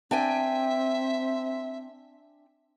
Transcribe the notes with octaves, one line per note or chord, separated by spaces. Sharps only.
C4 D4 E5 G5 G#5